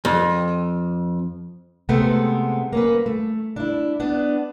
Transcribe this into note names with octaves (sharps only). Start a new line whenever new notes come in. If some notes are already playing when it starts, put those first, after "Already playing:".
F2
C3 G#3 A3 B3 C4
A#3 C#4 B4
A3
D4 E4
B3 D4